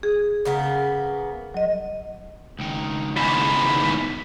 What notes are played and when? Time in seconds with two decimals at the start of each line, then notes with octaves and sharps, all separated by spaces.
0.03 G#4
0.45 C#3 A#3 B3
1.54 F#3 D#5
2.59 C#2 D#3
3.17 E2 G#2 B5